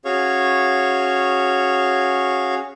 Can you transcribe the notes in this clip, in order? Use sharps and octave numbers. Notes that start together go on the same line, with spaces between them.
C#4 F#4 G#4 C#5 F5 C#6